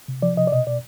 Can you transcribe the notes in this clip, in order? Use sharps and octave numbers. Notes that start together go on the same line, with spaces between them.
C3
F3 D5
C3 D#5
D5
B2 D#5
B2 D5